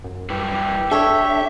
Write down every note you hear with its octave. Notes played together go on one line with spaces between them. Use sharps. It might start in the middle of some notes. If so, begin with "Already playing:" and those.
F#2
G3 E4 G4 B4
D4 A4 C#5 E5